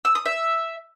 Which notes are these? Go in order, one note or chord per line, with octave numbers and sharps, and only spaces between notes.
E6
D#6
E5